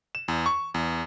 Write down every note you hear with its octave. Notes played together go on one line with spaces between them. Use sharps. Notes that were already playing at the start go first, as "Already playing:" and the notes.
E7
E2
C#6
E2